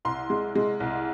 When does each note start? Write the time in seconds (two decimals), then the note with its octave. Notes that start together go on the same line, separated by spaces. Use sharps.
0.05 C2 C6
0.30 G#3
0.55 G#3
0.80 C2